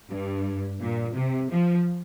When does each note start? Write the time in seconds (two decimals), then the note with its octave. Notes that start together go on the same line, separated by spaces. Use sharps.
0.10 G2
0.80 A#2
1.15 C3
1.50 F3